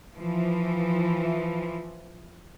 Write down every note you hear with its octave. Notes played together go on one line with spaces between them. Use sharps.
E3 F3